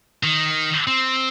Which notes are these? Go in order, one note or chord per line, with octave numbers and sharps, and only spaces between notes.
D#3
C4